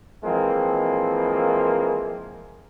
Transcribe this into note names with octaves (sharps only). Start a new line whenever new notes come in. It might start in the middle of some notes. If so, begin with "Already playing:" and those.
E3 F3 G#3 A#3 C4